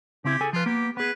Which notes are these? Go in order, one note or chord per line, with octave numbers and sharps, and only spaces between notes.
C#3 C4 E4 G4
G#4 A4 G#5
F3 F4 B4
A#3 B3 G4
B3 G#4 B4